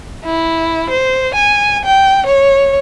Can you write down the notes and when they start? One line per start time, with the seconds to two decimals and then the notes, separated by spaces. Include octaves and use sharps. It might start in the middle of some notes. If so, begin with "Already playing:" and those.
0.24 E4
0.90 C5
1.35 G#5
1.85 G5
2.26 C#5